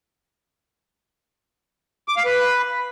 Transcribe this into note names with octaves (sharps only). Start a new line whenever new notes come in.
D6
F5
B4